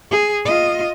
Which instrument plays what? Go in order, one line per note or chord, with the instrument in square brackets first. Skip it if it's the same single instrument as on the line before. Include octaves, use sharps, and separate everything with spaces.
[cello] G#4
F4 D#5